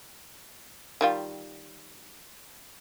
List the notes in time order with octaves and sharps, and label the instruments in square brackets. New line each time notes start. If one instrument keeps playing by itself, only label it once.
[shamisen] D#3 G3 F4